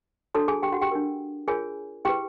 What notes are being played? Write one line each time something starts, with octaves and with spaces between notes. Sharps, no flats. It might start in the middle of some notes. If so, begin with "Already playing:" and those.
D4 F#4 A4 C#5 A5
G#4 G#5
G4 G5
F#4 F#5
G4 G5
D4 G4 A#4
F4 G#4 A#4 C#5 G#5
E4 G4 G#4 B4 G5